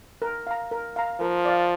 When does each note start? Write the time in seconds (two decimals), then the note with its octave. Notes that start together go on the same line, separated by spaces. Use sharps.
0.22 A#4
0.47 F5 A#5
0.71 A#4
0.96 F5 A#5
1.20 F3 A#4
1.45 D5 F5